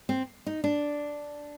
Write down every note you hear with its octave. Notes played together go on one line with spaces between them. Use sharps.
C4
D#4
D4